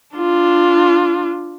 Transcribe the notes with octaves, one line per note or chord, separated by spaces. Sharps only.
D4 F4